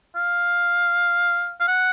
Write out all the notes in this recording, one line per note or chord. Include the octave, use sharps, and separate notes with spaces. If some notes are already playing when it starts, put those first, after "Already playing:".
F5
F5
F#5